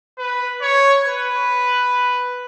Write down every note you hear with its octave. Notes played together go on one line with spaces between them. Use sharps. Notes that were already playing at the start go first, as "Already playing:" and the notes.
B4
C#5
B4